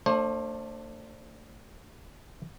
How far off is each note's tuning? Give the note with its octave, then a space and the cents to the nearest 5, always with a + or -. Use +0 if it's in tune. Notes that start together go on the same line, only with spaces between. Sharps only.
A3 +35 D4 +0 C5 +30